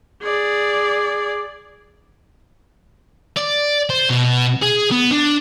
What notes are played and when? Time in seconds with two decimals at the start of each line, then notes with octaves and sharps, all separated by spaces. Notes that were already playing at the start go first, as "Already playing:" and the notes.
0.22 G#4 D5
3.37 D5
3.90 C5
4.10 B2
4.62 G#4
4.91 B3
5.11 D4